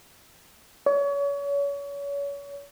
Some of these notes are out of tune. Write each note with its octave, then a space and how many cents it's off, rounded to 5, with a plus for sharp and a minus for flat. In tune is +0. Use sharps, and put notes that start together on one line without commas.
C#5 +35